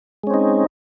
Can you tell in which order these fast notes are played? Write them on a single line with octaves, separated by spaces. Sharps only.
G#3 C#4 C4 D#4